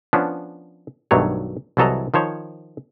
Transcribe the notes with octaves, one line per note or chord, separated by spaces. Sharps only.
F3 B3 C#4 D4
B1 G2 D#3 F#3 A3 C#5
C2 E3 F#3 A4 D#5 A#5
D#3 F3 C5 C#5